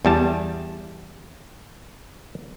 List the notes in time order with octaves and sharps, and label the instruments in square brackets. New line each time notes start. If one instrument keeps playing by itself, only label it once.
[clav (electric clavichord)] E2 G3 A5